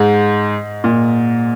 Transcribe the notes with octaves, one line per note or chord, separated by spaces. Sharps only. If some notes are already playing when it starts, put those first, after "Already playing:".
Already playing: G#2
A#2